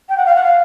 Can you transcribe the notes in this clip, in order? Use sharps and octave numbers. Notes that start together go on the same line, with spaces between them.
G5
F#5
F5
F#5
F5